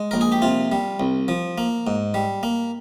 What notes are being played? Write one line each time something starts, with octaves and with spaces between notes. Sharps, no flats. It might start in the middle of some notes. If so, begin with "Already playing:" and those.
Already playing: G#3
A#1 A#4
G#4
G4
C3 F4
G3
C2
F3
A#3
G#2
G3
A#3